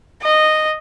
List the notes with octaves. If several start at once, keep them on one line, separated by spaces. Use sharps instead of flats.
D#5